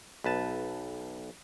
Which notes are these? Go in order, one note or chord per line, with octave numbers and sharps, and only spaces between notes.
B1 B4 A5